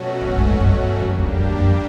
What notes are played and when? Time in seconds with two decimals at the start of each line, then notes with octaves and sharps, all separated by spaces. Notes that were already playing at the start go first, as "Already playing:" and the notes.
Already playing: B2 F#3 A3 C#4 F#4
0.21 G#2
0.30 A2
0.38 G#2
0.60 G2
0.99 F#2 G3 A#3 D4 G4
1.19 E2
1.38 G2
1.51 G2
1.58 F#2